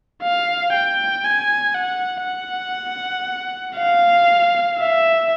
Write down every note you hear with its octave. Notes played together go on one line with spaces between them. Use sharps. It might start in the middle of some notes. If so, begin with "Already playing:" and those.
F5
G5
G#5
F#5
F#5
F5
E5